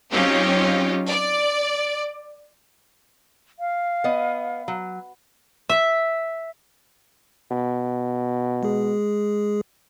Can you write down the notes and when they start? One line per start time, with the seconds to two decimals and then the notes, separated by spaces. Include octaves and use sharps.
0.12 F#3 C4 C#4 D#4 F4 G4
1.09 D5
3.59 F5
4.04 B3 D#5
4.68 F#3
5.69 E5
7.51 B2
8.63 G#3 G#4